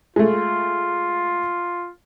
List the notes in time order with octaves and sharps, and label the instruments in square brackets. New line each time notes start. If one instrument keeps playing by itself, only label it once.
[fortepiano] G#3 A3 [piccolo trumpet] F4